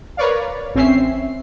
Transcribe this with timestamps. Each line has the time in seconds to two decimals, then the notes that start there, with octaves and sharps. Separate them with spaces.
0.17 A#4 B4 C#5 D5 F5
0.74 A1 C4 C#4 E5 C7